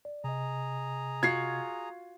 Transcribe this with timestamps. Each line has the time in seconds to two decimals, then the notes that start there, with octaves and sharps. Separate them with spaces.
0.05 D5
0.24 C3 G#4 D#5 A#5
1.23 F4 F#4 G#6 C7